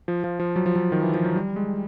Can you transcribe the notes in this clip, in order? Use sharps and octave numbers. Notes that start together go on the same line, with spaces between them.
F3
F3
F3
F#3
F3
F#3
D#3
E3
F3
F#3
G3
G#3